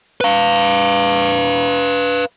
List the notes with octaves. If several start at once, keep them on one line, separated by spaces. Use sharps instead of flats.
B4 F5